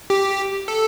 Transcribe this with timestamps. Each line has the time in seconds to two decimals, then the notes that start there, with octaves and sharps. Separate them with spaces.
0.10 G4
0.68 A4